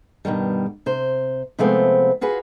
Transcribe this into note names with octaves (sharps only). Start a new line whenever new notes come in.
G2 B2 D#3 G3
C3 C5
C3 F3 G#3 A3 B3 C4
F4 F#4 G#4 B4